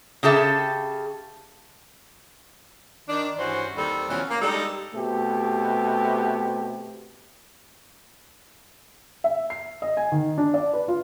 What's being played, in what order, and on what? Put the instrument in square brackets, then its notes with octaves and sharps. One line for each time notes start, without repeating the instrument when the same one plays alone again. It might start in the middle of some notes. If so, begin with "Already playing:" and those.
[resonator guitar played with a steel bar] C#3 G4 A4 E5
[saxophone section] D#3 D4
G2 E3 C#4 F#4 C5
D#2 D#3 G3 C4 A4
B2 E3 F3 A3 C#4
A#3
G3 G#3 D4 D#4 G4 A4
[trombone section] B2 A3 C4 G4
[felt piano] E5
C7
D#5
G#5
D#3
D4
D5
B4
F4